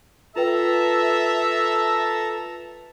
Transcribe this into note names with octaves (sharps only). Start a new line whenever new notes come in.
F4 A4 B4 E5 G5 A5 A#5